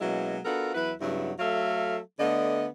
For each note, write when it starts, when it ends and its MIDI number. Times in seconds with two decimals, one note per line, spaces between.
0.01 0.38 47
0.01 0.38 54
0.01 0.38 56
0.01 0.38 58
0.01 0.38 61
0.01 0.38 64
0.45 0.73 59
0.45 0.73 62
0.45 0.73 65
0.45 0.73 66
0.45 0.73 69
0.45 0.73 70
0.74 0.92 40
0.74 0.92 54
0.74 0.92 64
0.74 0.92 71
1.00 1.31 43
1.00 1.31 49
1.00 1.31 54
1.00 1.31 59
1.00 1.31 64
1.39 1.97 54
1.39 1.97 57
1.39 1.97 69
1.39 1.97 76
1.39 1.97 77
2.19 2.65 50
2.19 2.65 57
2.19 2.65 59
2.19 2.65 62
2.19 2.65 75